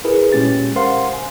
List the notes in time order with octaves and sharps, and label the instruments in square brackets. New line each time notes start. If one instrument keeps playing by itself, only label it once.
[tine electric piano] E4 G#4 A#4 B4
A#2 G#3 C#4 G4 A6
A#4 C5 F5 F#5 C6
G1 G#5